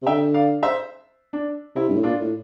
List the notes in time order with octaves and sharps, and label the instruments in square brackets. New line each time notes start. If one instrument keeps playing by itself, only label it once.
[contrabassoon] C3
[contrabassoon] D3 [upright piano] E5 G5
[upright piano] D5 F5
C5 E5
D4
[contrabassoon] C3 [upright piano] E4
[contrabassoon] G2
A2
[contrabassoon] A#2 [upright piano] D4 F4
[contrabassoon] A2